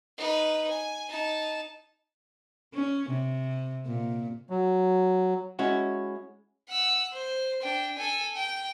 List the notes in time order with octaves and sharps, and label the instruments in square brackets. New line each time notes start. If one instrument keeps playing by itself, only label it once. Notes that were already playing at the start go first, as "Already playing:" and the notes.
[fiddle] D#4 B4
G#5
D#4 A5
[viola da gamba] C#4
C3
A#2
[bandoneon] F#3
[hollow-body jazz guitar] G#3 C#4 E4 F#4
[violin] F#5 E6
C5
D4 G5
A4 G#5
G5